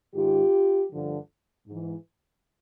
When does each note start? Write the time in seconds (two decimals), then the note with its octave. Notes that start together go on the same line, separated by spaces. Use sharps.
0.14 G#2 D#3 F4 G4
0.90 G2 D3 F3
1.67 G#2 E3